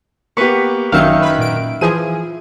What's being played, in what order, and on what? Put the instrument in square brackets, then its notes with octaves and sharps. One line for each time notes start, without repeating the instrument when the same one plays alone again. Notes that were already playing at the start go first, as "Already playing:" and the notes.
[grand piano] A#3 B3 G4 [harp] B4 C#6
[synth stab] G#1 F#3 C#7 [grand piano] F#2 D#3 [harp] D#4 E5 F5
[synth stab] B4 B5
A#2 D7
[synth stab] E3 F3 G#4 [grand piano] D#7